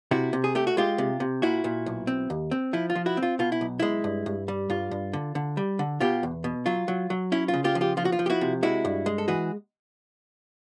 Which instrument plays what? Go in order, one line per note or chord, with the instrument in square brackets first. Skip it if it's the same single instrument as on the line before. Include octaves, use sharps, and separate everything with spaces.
[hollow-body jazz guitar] C3 E4 F#4
C3
G#4
A3 G4
F#4
G#3 F4 G4
C3
C3
A#2 E4 F#4
A#2
B1
C4
D#2
C4
F3 E4
F4
F3
E4 F#4
C4
F4
B2 F4
E4
B1
G#3 E4
G2
G2
G3
G2 F4
G2
D3
D3
G3
D3
B2 F4 G4
E2
B2
F#3 F4
F#3
F#3
C#4 E4
F4
C#3
F4 G4
F3
F4 G4
F3 F4
F#4
F4
F3
G4
E4 F#4
C3
G#3 E4 F#4
G2
G#3
A4
E3 F#4 G#4